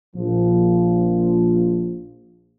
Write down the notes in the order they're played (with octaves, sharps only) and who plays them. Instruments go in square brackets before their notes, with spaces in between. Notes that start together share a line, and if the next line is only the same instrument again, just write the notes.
[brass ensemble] A#1 F3